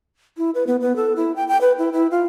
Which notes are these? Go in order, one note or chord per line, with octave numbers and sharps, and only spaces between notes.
E4
B4
B3
B3
A4
E4
G5
G5
B4
E4
E4
F4